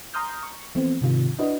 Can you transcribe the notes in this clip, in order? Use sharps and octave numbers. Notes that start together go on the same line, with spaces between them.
A#5 C6 D#6 F6 G6
C#6
E3 F3 A3 B3 C4
G#2 C3 D#3 F4
D4 E4 F#4 B4 D#5